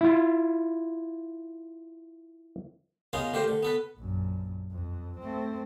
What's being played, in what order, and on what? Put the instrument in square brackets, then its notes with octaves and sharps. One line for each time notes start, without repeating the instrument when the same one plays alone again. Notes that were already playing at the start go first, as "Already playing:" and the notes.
[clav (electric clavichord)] E4 F4
[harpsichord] B3 C#4 D#4 F4 G#4 A#4
D3 A3 G4 A#4 C5
D3
B3 A4 B4
[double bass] A#1 F#2
F2
A3 C4